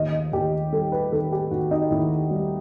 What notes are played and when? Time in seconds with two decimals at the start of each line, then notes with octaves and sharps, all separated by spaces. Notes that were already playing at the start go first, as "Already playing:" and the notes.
Already playing: D#2 D#5
0.12 D#5
0.33 D#2 G4
0.72 G3 A4
0.92 B4
1.12 D#3 A4
1.32 G4
1.51 D#2 F#4
1.71 D#4
1.91 D#2 E4
2.31 G3